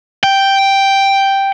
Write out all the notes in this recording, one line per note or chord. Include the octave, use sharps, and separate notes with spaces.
G5